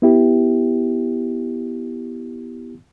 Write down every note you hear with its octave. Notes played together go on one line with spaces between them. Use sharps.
B3 E4 G4